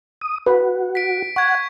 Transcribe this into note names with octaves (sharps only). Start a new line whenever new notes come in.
D#6
F#4 B4
B6 D7
F#5 C#6 G#6